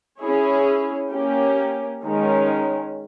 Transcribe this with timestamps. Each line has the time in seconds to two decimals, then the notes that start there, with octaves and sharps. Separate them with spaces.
0.19 C#4 E4 G#4 C#5
1.11 A#3 C#4 G4
2.03 D#3 G#3 C#4